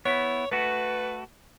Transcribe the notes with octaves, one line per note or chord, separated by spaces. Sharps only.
B3 E4 C#5
A3 F#4 B4